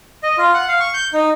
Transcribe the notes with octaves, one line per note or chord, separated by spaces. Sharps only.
D#5
F4
F#5
F5
C#6
G6
D#4